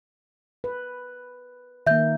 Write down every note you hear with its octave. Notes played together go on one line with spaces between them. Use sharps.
B4
D#3 A#3 E5 G6